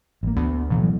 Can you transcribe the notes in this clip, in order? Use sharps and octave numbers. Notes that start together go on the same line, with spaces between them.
A1 A#3
D2 B3
A1 D2 B2 E3
E3 F#3 B3